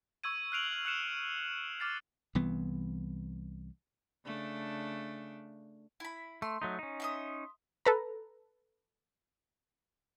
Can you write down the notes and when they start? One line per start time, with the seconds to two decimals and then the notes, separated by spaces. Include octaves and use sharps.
0.24 C#6 E6 G#6 D#7
0.52 F6 F#6 C7 D7 F7 F#7
0.85 F6 F#6 C#7 E7
1.80 D6 F6 A6 C7
2.35 C2 E3 B3
4.25 C#3 A3 D4
6.00 E4 B5
6.42 A3 C6
6.62 F#3 A3 D#4
6.79 C#4 D#4
7.00 E5 C6 D#6
7.85 A4 B4 A#5